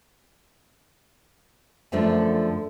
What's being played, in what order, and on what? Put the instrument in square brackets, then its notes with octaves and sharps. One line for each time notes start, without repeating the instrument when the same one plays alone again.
[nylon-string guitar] F#2 D3 F3 A3 D4